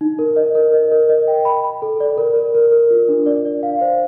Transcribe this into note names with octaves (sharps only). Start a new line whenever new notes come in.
D#4
A#4
D#5
A#4
D#5
A#4
D#5
G5
B5
B5
A4
D5
A#4
A#4
A#4
A#4
F4
D4
D5
D5
F5
C5